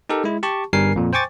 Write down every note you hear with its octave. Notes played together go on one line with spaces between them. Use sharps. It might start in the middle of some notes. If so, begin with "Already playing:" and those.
D#4 G4 A4 A#4
G#3 E4
G4 A5 C#6
G1 G2 G3 A#4 G#5 C7
F2 A#2
C5 G5 G#5 C#6 D6 A6